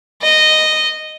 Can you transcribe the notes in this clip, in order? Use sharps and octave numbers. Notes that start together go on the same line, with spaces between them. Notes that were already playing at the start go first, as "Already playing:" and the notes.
D#5